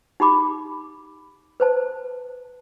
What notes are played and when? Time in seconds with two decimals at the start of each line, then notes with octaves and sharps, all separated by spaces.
0.20 D#4 G4 B5 D6
1.60 B4 C5 A5